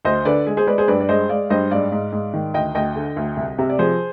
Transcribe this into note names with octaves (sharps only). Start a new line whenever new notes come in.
D2 C5 D#5
D3 B4 D5
G#3 G#4
G#4 C5
G#3 B4 D5
G#4 C5
G2 B4 D5
D5
G#3 C5 D#5
G#3 D5 F5
G2 C5 D#5
G#2 D5 F5
G#2
G#2
D#3
D2 D#5 G5
D2 D#5 G5
D3
D2
C2
C3
D5
F3 G#4 C5